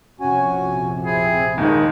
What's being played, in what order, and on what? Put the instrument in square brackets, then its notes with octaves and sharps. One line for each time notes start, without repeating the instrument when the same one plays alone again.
[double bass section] A#1 F2 C3 [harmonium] C#4 F#4 G#5
[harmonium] C4 E4 [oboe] G#4
[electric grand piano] D#2 D#3 [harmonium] G#3 [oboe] D#4